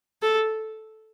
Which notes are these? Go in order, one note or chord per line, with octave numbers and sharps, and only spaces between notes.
A4